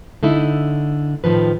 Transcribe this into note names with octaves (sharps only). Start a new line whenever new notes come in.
D3 A3 D#4 E4
A2 D#3 F3 B4